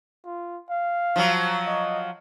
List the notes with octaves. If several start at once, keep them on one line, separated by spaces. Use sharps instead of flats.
F4
F5
F3 F#3
D#5